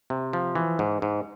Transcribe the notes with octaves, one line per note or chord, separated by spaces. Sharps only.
C3
F3
E3
G#2
G#2